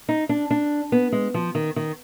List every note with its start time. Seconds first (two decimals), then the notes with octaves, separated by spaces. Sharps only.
0.09 D#4
0.29 D4
0.51 D4
0.92 B3
1.12 G#3
1.34 F3
1.55 D#3
1.76 D#3